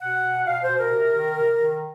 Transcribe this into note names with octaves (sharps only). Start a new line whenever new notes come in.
B2 F#5
B2
B2 F5
C5
B2
A#4
C3
D#3
C3
D#3